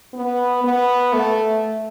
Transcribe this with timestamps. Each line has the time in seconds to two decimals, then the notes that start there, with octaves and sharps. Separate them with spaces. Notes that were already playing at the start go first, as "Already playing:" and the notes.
0.14 B3
0.64 B3
1.13 A3